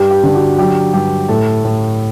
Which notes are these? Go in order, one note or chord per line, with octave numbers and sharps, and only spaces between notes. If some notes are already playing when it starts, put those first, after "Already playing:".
Already playing: G2 G4
G4
D3
F#4
F#3 G4
G2 G4
A2 A3 A4
A2